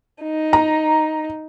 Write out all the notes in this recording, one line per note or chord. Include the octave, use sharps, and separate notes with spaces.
D#4
A#5